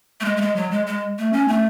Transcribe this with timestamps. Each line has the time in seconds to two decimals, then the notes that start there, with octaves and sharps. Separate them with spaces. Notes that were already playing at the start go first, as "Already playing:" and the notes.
0.21 A3
0.25 G#3
0.37 A3
0.41 G#3
0.56 F#3
0.71 G#3
0.87 G#3
1.18 A3
1.33 C#4
1.48 A3